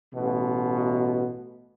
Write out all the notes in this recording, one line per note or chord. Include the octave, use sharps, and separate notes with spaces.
A1 B2